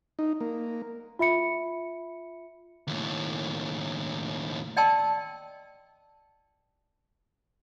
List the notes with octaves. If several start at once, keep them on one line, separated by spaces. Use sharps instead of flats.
D#4
A#3
F4 E5 B5 C#7
D#2 A2
D5 D#5 G5 A5 C6 E6